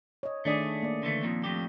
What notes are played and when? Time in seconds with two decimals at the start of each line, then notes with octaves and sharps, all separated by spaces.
0.23 C#5 D#5
0.45 D#3 A3 D4 G#4 D5
0.83 A#3 D5
1.03 D3 E3 A3
1.23 F2 A#2 D#3
1.44 F2 A2 G4